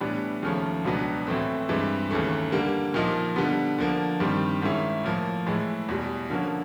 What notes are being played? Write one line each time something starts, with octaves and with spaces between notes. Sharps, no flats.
A2 E3 G3 B3 D4
D#2 C#3 F3 A3 C#4
C#2 B2 F#3 B3 D4
A2 E3 A3 C4
G2 E3 G#3 C4
D#2 C#3 E3 A3
D3 G3 A#3
A#2 F3 A#3 D#4
D3 G3 B3
D3 F3 A#3
G2 D#3 G3 C4
G#2 D#3 G#3 C#4 E4
A2 F3 A#3
A2 E3 G#3
E2 B2 G3
D3 F3 A#3 C#4 F#4